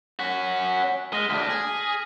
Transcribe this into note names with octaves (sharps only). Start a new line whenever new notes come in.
C#4 F#4 B6
G#3 F6 A#6 D#7
D2 D4 B6
G#4